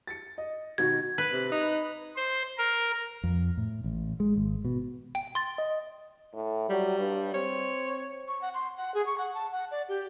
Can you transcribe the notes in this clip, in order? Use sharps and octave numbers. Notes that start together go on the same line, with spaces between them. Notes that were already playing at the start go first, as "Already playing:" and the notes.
A6 C#7
D#5
B2 D#3 F#4 G#6
B4
C3
D#4
C5
A#4
F2
A2
A1
G#3
G#1
B2
G5
C6 A6
D#5
A2
F#3 G3
G2
C4 C#5
C#6
F#5
C6
F#5
G#4
C#6
F#5
A5
F#5
D5
G4